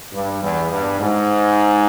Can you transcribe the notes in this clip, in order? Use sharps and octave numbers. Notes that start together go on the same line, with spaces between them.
G2
E2
G2
G#2